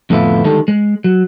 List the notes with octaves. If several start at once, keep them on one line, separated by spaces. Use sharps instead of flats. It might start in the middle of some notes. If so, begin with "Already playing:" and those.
F2 A2 D3 B3 E4 F4
D3 D#3 G3 G#3 A4
G#3
F#3